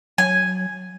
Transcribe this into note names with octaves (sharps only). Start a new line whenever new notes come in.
F#3 G#5